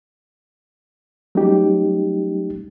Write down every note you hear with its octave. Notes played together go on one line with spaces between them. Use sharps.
F#3 G3 A3 C#4 D#4 G4